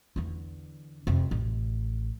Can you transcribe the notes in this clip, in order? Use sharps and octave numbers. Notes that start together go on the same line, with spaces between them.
E2 D3
F2 C3
A1